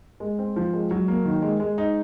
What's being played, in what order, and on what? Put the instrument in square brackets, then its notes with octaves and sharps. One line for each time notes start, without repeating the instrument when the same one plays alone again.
[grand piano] G#3
C4
F3
G#3
F#3
A#3
D#3
G#3
G#3
D#4